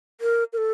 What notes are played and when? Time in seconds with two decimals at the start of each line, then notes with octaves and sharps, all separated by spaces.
0.21 A#4
0.53 A#4
0.58 A4